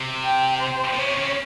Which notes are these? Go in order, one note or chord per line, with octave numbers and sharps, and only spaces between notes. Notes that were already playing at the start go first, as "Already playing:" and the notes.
Already playing: C3
G5
C5
A#2
C3 C#5
C#3